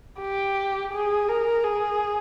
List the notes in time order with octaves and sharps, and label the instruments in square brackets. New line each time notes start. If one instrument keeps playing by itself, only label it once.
[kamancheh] G4
G#4
A#4
G#4